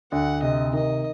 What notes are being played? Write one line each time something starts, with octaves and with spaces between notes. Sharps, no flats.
D2 F#5
C3 D#5
D#3 D#5